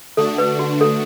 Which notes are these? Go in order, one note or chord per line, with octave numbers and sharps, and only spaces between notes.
D3 A3 D4 F#4 A4
B4
F#4
A4